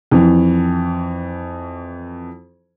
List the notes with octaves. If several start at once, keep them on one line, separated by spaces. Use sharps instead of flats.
F2 E3